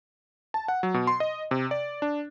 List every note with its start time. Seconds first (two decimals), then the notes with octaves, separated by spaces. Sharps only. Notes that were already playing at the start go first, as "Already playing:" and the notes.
0.54 A5
0.68 F#5
0.83 F#3
0.94 B2
1.07 C6
1.20 D#5
1.51 C3
1.71 D5
2.02 D4